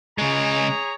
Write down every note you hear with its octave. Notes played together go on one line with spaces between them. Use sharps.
C#3 G#3 G#4 C#5 A#5